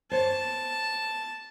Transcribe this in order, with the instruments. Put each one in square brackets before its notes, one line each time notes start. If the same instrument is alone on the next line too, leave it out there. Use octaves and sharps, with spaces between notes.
[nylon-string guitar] C5 C#5 [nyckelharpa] A5